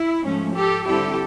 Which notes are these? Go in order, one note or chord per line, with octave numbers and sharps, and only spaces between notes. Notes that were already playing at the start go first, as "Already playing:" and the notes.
Already playing: E4
G#2 F3 A3 C#4
G4 A4
D3 G3 C4 E4 G4 A4